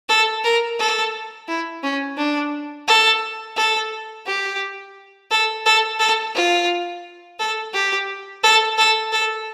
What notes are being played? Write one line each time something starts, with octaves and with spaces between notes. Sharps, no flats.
A4
A#4
A4
E4
C#4
D4
A4
A4
G4
A4
A4
A4
F4
A4
G4
A4
A4
A4